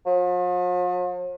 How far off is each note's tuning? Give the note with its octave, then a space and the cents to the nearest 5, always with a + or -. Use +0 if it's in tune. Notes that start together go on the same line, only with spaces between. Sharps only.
F3 +45